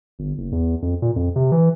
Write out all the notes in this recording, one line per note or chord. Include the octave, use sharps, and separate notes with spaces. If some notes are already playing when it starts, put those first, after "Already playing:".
G1
F#1
E2
F2
A#2
F2
C3
E3